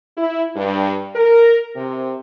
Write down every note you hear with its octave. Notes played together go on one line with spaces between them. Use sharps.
E4
G2
A#4
C3